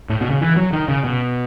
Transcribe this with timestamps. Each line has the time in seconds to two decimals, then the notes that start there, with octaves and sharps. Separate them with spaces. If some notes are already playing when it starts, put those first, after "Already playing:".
0.09 A2
0.21 B2
0.30 C#3
0.41 E3
0.56 F#3
0.73 D#3
0.88 C#3
1.04 B2